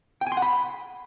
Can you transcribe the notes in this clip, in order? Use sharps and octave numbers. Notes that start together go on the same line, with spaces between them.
G5
G#5
C6
F#5
B5